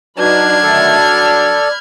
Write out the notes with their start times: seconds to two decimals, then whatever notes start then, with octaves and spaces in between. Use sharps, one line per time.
0.19 F#3 D4 D#4 F#4 B4 B5 F6 G#6
0.63 D3 D#3 A3 A4
1.07 D5